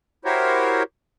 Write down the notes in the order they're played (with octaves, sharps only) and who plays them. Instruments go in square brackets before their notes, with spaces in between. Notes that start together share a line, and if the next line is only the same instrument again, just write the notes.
[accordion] E4 F#4 G4 A#4 C5 C#5